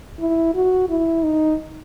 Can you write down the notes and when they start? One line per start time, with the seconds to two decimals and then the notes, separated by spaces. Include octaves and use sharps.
0.20 E4
0.55 F#4
0.89 E4
1.23 D#4